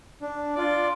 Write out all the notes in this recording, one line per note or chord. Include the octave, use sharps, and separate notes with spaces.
D4
F4 D5